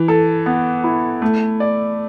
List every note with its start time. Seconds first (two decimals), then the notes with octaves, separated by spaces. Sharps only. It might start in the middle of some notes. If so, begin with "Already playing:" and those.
Already playing: E3
0.08 A4
0.46 B3
0.84 E4
1.22 A3
1.60 D5